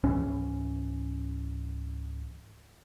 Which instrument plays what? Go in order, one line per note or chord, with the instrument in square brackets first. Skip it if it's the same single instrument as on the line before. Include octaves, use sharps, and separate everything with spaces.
[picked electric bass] C#2 G#2 E3 C#4